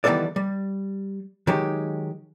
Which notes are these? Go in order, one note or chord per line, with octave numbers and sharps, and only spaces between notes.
D#3 E3 G3 B3 A4 D5
G3
D#3 F#3 G#3 D#4 G4